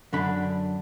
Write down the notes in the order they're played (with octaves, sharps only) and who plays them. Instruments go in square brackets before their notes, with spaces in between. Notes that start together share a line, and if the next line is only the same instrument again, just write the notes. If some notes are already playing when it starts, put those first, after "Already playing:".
[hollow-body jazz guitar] F#2 D3 D4 B5